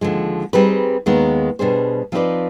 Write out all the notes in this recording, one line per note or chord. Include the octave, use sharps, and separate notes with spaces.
D#2 D3 F3 G#3
G3 C4 D#4 G#4 B4
D#2 D#3 G#3 B3
B2 G3 D4 G#4 C5
F3 C4 D#4 B4 D5